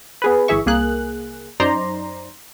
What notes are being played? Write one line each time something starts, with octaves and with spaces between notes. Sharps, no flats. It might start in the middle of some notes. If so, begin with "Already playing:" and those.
B3 G#4 B4
G1 E3 G#4 E5 C#6
C2 A#3 G#4 F#6
F#2 D#4 C5 D5 A#5 C6